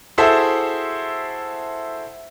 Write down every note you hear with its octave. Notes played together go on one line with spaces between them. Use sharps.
E4 F#4 G#4 A4 C5 E5